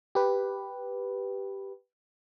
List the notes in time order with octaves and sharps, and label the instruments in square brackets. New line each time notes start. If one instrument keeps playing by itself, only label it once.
[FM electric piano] G4 B4